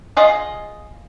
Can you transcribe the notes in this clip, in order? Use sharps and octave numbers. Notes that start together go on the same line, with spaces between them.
F4 G#4 D#5